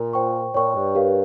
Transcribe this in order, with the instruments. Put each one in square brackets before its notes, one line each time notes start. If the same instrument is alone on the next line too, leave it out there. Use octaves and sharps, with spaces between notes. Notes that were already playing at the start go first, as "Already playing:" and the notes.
Already playing: [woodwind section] A#2
[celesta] C5 G5 C#6
[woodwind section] A#2 [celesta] C#5 G5 C#6
[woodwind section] G2
[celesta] G4 A#4 C#5 F5